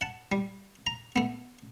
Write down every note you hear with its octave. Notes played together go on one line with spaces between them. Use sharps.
F#5 A5
G3
A#5
A3 B3